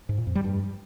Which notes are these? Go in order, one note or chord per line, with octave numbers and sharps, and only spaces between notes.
G#2
A#2
F2
G3
G2